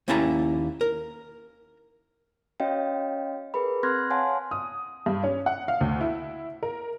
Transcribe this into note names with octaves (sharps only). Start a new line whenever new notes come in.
D#2 A#3 C#4 E4 A5 A#5
A#4
C#4 F#4 C#5 D#5 F5 G5
G#4 A#4 B4 B5
C4 C6 F6 F#6 G#6 A#6
C#5 F5 F#5 G#5 A5 C6
D#6
G2
C#4
F#5
F5
D2
E4
A#4